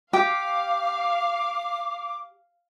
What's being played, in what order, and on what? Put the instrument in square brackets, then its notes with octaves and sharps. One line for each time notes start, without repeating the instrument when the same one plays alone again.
[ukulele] G4 [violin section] F5 [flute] D6